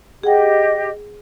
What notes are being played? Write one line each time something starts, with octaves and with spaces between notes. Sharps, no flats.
G4 G#4 D#5 F#5 G5